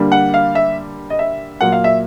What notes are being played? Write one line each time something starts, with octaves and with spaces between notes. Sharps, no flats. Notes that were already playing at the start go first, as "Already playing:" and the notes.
Already playing: D3 G3 A#3
F#5
F5
E5
D#5
E5
A#2 F#3 A#3 F#5
F5
E5